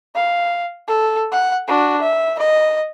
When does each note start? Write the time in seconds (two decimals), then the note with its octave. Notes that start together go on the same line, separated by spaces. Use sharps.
0.15 F5
0.88 A4
1.32 F#5
1.68 D4 F#4
2.01 E5
2.39 D#5